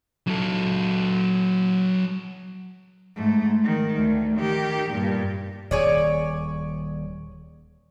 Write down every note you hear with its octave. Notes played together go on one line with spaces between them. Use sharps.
F#3 A4
G#2 A3
D#3
D2
D#3 G4
G2 A#2
D#1 G#4 C#5 D5